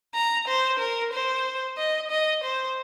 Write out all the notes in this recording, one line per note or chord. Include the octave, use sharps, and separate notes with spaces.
A#5
C5
A#4
C5
D#5
D#5
C5